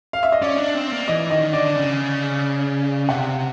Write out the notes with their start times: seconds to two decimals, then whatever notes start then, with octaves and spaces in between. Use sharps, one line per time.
0.13 F5
0.23 E5
0.32 D#5
0.41 C#4 D5
0.58 D4
0.74 C4
0.92 A#3
1.08 E3 D#5
1.30 D#3 D#5
1.52 D3 D5
1.76 C#3
3.09 C3 F#5